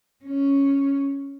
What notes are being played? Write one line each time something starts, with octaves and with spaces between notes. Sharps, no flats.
C#4